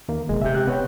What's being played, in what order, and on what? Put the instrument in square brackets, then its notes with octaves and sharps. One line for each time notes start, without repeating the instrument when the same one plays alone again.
[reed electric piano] D#2 A#3
[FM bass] E1 [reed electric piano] G#3
[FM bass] C3 [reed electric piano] E5 G6
[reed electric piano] G4 F#6
B3 C#5 G5